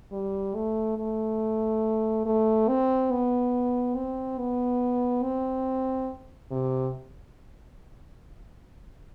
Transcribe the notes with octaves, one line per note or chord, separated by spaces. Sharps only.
G3
A3
A3
A3
C4
B3
C4
B3
C4
C3